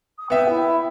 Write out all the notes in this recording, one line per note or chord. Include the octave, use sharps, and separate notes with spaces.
D#6
B3 E5 G5
E4